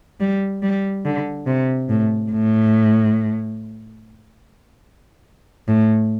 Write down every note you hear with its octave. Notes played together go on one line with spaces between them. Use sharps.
G3
G3
D3
C3
A2
A2
A2